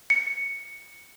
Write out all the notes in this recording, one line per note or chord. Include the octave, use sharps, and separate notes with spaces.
C#7